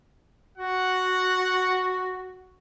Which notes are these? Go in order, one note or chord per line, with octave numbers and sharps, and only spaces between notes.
F#4 F#5